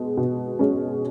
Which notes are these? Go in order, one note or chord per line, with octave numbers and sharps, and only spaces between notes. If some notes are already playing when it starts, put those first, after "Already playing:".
Already playing: B2 G#3
B2
G#3 C#4